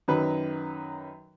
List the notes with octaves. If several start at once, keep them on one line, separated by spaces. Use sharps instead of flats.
F#2 D#3 F#3 B4